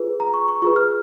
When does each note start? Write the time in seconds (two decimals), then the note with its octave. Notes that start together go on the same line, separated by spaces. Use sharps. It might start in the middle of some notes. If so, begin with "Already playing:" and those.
Already playing: F4 G#4 B4
0.20 A#5
0.34 C#6
0.48 C#6
0.62 F4 G#4 B4 C#6
0.76 F6